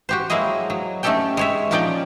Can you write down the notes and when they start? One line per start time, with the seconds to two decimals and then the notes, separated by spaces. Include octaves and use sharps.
0.09 F#4 G4 C5
0.30 F#3 G#3 A#3 E4 G#4 D#5
0.70 F#3
1.03 A3 C#4 D#4 G4 A4 G5
1.37 G#3 C#5 E5
1.71 A#2 F3 C#4 D#4 D5 G5